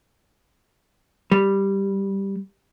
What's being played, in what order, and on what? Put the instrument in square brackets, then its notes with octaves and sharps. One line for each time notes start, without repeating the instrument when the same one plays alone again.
[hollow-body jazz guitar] G3